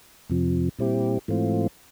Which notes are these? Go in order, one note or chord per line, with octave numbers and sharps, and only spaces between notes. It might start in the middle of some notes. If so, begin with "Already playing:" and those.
F2 C3 F3
A#2 G3 C4 E4 G4
G#2 E3 A3 C4 F4